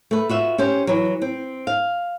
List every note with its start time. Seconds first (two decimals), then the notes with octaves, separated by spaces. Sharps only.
0.11 A3 B4
0.29 F4 F#4 E5
0.58 C#4 G4 C5
0.87 E3 F#3
1.22 C4
1.67 F5